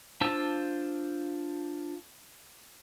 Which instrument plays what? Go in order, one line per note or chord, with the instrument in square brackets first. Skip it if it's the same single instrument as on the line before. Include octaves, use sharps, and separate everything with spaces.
[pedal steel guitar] D4 F4 C5 A5 E6